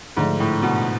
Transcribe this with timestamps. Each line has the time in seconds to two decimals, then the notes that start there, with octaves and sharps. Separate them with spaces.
0.17 G#2 D3 F3 A3 D4
0.40 A2
0.62 B2